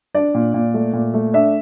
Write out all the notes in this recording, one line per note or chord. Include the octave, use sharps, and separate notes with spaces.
D4 D5
A#2
A#2
A3
A#2
A3
D4 E5